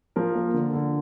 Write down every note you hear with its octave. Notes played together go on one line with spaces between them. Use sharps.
F3 A#4
A#3
D3
D3